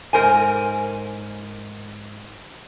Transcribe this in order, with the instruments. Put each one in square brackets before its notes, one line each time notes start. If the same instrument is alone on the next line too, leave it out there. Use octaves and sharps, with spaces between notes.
[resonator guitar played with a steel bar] G#2 A#4 C5 G#5